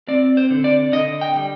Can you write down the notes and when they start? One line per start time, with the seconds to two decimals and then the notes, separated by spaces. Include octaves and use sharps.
0.08 C4 D5
0.37 C5
0.50 D3
0.64 D5
0.92 D3 D#5
1.21 G5
1.36 G3